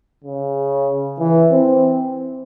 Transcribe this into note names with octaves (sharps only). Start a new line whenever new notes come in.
C#3
E3
C4